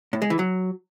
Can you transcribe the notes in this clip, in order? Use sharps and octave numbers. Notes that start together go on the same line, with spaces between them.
A2
G#3
E3
F#3